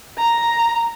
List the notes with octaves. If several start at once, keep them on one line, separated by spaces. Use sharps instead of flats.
A#5